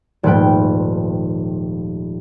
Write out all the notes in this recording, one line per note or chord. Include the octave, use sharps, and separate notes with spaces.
D#1 G#2 F3 A3 B4 G5